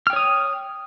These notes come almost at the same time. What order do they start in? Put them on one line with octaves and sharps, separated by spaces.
F6 G5 C#5 D#6